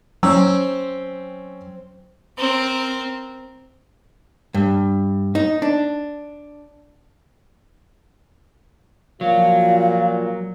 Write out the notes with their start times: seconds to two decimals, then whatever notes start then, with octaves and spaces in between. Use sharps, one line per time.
0.23 F#3 C4 C#4 E6
2.37 C4 A#4
4.54 G2
5.35 D#4
5.62 D4
9.21 A#2 F3 F#3 F#4 F5